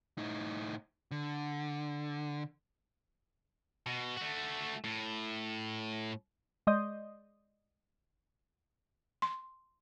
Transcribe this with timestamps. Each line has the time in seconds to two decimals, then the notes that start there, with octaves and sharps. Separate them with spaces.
0.18 A2 D#4
1.11 D3
3.87 B2
4.17 A3 F#4
4.84 A2
6.67 G#3 D5 D#5 C6 D#6 G6
9.22 C6